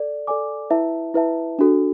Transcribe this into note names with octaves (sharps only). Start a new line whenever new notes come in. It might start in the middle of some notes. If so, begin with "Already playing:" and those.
Already playing: A4 D5
A4 D5 G#5 D6
E4 B4 E5 A5
E4 B4 E5 A5
D4 F#4 A4